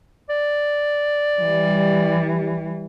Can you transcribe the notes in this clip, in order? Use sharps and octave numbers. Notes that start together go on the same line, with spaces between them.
D5
E3 G3